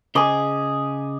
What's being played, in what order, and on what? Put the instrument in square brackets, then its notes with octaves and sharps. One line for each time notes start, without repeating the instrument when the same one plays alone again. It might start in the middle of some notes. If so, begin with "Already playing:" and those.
[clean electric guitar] C#3 G#4 [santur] D#5 G#5 D6